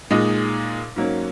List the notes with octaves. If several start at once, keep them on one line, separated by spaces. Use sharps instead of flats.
A#2 G#3 D#4
G#2 F#3 A#3 C#4